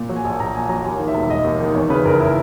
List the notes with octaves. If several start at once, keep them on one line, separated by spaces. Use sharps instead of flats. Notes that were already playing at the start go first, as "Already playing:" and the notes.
Already playing: A#2
F#3
G#5
A#1
A#1 A#5
A#2 G#5
F#3 A#5
D#2 G#5
D#3
E5
E1
E1 D#5
D#2
D#3
E2 C#5
C#3 B4
F#1 A#4
E4